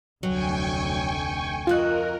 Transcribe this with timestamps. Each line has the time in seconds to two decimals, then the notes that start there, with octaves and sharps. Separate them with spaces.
0.23 F1 D2 F#3 G5 G#5 C#6
1.67 F2 F4 F#4 A#4 D#5 F#6